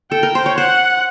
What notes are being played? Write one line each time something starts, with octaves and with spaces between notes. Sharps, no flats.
A4 G5
A#4
C5
C#5
C5 F#5